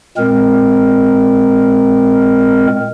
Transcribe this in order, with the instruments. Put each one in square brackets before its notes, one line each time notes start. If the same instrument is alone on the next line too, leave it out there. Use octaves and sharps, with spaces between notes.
[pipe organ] A#2 G#3 C4 A#4